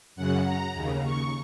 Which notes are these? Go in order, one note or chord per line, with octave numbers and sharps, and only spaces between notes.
F#2 C#3 F#5
A#5
D#2 C#3
C#6